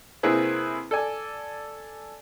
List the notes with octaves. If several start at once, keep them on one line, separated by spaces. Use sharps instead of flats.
C3 A#3 C4 E4 G#4 B4
A4 D5 G#5